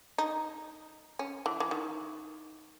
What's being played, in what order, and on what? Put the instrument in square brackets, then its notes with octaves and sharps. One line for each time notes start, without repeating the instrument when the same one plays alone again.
[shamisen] D#4
C#4
E3
E3
D#3